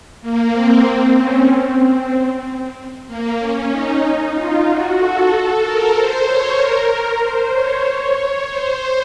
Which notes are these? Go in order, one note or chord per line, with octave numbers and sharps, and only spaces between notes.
A#3
C4
C#4
C4
A#3
C#4
D#4
D#4
F4
F#4
A4
A4
A#4
C5
C#5
A#4
A#4
C5
C#5
C#5
C5